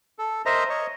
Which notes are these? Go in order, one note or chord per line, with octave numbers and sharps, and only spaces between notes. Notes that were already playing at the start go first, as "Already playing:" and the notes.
A4
A#4 C5 D#5 E5 A#5
C#5 D#5